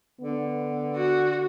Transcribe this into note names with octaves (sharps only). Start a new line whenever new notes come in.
D3 B3
F#4